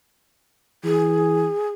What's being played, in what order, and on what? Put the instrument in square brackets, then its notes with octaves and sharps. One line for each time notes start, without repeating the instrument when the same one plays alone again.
[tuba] E3 [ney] G#4